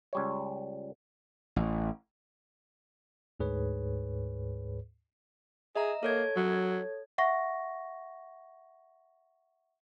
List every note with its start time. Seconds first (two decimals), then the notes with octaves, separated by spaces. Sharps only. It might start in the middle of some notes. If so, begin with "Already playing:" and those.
0.13 C#2 G3 C#5
1.56 A1
3.40 D2 G#2 G#4 B4 C#5
5.76 G#4 D#5 E5 A#5
6.03 A#3 A4 C#5 G#6
6.36 F#3
7.18 E5 F#5 C#6 A#6